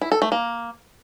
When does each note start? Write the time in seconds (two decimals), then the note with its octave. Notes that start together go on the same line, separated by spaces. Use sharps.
0.01 E4
0.12 A4
0.22 A3
0.32 A#3